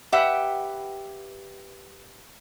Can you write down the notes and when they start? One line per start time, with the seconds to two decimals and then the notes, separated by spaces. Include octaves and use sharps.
0.12 G4 B4 E5 F#5 G5